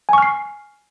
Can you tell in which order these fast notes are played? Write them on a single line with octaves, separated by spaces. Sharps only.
G#5 C#6 F6 C7